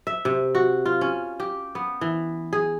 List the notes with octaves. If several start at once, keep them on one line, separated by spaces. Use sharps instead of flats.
E5
C3
F#4
F4
C#4
G4
B3
E3
G#4